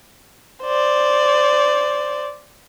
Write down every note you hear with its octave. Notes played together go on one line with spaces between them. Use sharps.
C5 D5